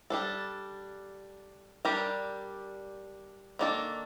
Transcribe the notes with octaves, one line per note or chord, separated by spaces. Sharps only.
G3 D4 A4
G3 D4 G4 A#4
D#3 A#3 D4 A4